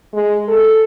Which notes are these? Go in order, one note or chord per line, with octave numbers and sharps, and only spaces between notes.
G#3
A4